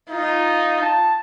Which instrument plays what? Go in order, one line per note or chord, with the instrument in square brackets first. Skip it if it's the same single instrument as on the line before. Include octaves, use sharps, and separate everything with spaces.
[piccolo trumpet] D#4 [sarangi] F4
[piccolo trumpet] A5